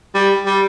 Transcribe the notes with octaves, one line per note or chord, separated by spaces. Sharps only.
G3
G3